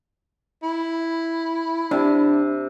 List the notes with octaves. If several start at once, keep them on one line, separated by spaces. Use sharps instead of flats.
E4
C3 D4